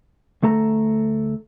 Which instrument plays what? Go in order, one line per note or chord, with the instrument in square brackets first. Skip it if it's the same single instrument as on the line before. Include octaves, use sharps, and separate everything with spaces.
[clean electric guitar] D2 A3 A4 A#5